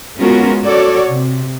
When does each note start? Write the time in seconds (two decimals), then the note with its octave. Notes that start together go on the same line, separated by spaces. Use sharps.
0.18 G#3 B3 C#4 F4 F#4 A#4
0.63 F#4 A4 C#5 D5
1.09 C3